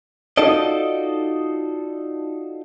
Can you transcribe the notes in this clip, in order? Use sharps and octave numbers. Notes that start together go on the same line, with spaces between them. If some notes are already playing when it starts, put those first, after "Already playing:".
D#4 F4 F#4 A4 D5 D#5